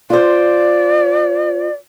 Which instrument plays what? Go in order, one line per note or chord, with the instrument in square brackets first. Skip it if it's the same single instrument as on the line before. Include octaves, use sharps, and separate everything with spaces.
[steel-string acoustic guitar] F4 C5 [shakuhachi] D5